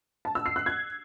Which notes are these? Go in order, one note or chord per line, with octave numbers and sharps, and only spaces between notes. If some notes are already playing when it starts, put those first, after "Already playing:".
A5
E6
C7
F#6
G#6